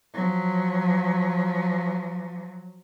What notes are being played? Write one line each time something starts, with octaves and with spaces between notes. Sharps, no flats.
F3 F#3